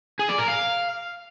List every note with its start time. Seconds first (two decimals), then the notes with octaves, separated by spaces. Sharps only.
0.19 G#4
0.29 D5
0.38 A#4
0.48 F5